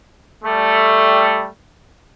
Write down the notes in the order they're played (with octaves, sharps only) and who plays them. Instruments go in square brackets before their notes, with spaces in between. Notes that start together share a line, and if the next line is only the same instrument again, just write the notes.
[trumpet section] G3 A3